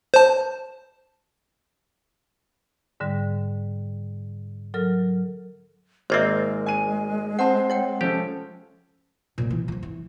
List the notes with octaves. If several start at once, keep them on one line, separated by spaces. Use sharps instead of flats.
C5 A5
G#2 D3 G3
F#3 A4 A#4 F6
G#1 G#3 A#3 C4 C5 D#5 E5
G#5 D#7
C4 C5 F#5 A5
C#5 F#5 G5
F3 C#4 G4 A4 C5
A#2 G#3
E3
E3 F3
E3